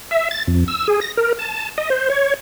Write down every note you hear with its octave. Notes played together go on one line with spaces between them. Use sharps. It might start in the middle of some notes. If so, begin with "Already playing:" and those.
E5
A6
F2
E6
G#4
A#6
A#4
A5
D#5
C5
C#5